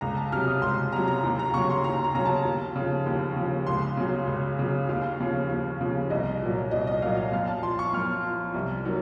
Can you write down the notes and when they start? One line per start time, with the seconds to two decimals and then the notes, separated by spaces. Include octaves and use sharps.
0.01 C#2 A#5
0.17 A5
0.32 C3 F#3 F6
0.48 D#6
0.62 C#2 C6
0.92 C3 F#3 A#5
1.08 A#5
1.24 D#2
1.39 A#5
1.54 C#3 F#3 C#6
1.70 C6
1.84 D#2 A#5
2.04 A#5
2.15 C#3 F#3 A#5
2.26 A5
2.45 D#2
2.76 C#3 F3
3.06 D#2
3.36 C#3 F3
3.67 C#2 C6
3.97 C#3 F#3
4.27 C#2
4.59 C#3 F#3
4.89 D#2 F5
5.20 C#3 F3
5.50 D#2
5.81 C#3 F3
6.10 C2 D#5
6.42 A#2 F#3
6.71 C2 D#5
6.87 D#5
7.02 A#2 F#3 F5
7.17 F5
7.32 F#2 F5
7.47 A5
7.63 F3 C6
7.79 C#6
7.93 F#2 F6
8.24 F3
8.54 C2
8.85 D#3 F#3